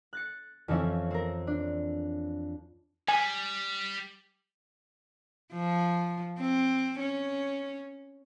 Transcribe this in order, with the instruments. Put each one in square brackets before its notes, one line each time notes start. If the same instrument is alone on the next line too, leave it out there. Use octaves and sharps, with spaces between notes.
[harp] F#6 A6 C#7
F2 E3 F3 C4 C#4 E4
C4 A#4
D4
[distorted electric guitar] G3 [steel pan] G#5
[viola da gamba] F3
C4
C#4